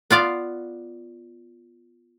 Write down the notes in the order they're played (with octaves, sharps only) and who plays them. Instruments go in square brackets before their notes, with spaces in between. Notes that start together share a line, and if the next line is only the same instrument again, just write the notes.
[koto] B3 F4 D5 F5